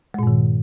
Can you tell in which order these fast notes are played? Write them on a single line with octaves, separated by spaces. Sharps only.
G#3 A#2 G2 D#3